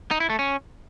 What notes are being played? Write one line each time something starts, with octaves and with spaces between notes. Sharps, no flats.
D#4
E4
A3
C#4